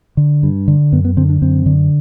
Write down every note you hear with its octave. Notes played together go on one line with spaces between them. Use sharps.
D3
G2
D3
F#2 B3
B3
D3 C4
D4
F#2 C4
D3